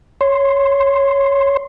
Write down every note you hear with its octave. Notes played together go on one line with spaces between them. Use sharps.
C#5 C6